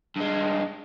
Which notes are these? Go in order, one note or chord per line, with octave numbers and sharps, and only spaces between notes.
G2 G#3